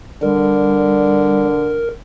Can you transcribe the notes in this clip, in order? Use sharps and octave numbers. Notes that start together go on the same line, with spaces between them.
D3 G3 A#4